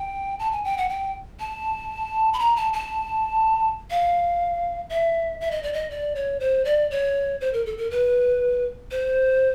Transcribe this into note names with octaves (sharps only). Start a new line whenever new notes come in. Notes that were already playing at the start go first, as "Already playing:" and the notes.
Already playing: G5
A5
G#5
G5
F#5
G5
A5
B5
A#5
A5
A5
F5
E5
E5
D#5
D5
D#5
D5
C#5
C5
D5
C#5
C5
A#4
A4
A#4
B4
C5